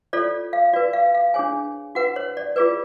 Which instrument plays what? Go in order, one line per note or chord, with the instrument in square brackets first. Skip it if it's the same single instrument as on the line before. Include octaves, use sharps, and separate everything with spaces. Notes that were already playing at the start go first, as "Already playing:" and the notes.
[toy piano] F4 A4 C#5 D5
F5
F#4 B4 D5
F5
F5
D4 G#4 C#5 G#5
F#4 B4 F#5
C#5
D5
F4 G#4 B4 D5